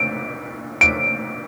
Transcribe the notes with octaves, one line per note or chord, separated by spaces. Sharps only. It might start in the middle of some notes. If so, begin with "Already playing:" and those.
Already playing: D7
D7